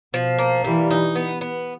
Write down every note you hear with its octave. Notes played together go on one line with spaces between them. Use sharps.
B2 F3
A#3
E3 G3
D#4
B3
B3